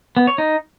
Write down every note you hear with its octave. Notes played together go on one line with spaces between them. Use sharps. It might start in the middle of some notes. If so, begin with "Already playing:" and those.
B3
C#5
D#4